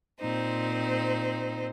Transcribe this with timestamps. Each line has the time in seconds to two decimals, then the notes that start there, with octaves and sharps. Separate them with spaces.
0.20 A#2 C4 D#4 C5